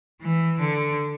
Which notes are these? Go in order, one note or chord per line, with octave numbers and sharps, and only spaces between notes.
E3
D3